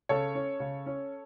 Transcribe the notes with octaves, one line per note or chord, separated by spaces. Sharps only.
C#3 A4 C#5
C#4
C#3
C#4